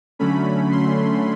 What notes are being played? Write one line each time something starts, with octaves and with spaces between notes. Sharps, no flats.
D3 F#3 A3 C#4 B5
C6